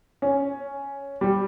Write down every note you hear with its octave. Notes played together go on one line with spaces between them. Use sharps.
C#4
G3